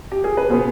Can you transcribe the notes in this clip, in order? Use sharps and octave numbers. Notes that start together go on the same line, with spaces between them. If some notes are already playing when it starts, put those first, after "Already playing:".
G4
G#4
B4
B2 B3 G#4 C5